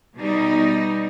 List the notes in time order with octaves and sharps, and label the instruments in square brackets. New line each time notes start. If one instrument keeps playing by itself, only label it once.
[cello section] B2 G3 D#4